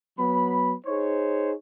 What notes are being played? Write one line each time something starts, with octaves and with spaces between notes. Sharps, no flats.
F#3 B3 B5
D#4 G#4 C5 C#5